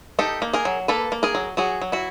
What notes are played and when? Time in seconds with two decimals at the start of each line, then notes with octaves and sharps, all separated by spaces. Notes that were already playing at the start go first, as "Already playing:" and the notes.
0.19 D#4 G4 A4
0.42 A#3
0.53 G#4 A#4
0.65 F#3
0.88 A#3 A4 B4
1.12 A#3
1.23 G#4 A#4
1.35 F#3
1.57 F#3 F#4 G#4
1.82 F#3
1.92 E4 F#4